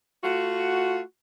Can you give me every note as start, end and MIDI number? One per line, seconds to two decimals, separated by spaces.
0.24 0.99 57
0.24 0.99 65
0.24 0.99 66